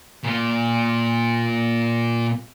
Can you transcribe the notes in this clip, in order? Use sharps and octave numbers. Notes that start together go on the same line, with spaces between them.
A#2 F4